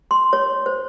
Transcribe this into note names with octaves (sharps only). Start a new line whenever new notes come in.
C6
C#5
C5